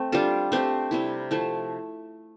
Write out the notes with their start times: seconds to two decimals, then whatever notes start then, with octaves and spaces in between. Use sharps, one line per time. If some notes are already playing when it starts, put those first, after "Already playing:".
Already playing: A3 C4
0.12 G3 D4 F4 A4
0.52 A3 C4 G4 C5
0.91 C3 G3 C4 E4
1.31 F3 A3 E4